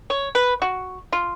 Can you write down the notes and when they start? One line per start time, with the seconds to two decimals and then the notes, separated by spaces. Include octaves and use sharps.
0.10 C#5
0.35 B4
0.62 F#4
1.12 F4